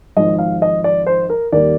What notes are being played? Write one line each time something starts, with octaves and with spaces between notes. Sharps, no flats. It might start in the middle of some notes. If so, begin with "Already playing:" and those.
G#1 G#2 F3 D#5
F5
D#5
D5
C5
A#4
D#2 D#3 G3 A#3 D5